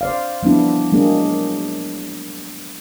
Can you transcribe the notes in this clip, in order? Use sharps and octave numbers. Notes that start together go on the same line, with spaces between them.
C5 D5 F5
F3 G3 B3 D4 E4
F#3 G#3 A#3 D4 G#4